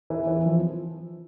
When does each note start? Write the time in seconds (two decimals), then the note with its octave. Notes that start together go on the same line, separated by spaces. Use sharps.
0.10 E3
0.27 E3
0.46 F3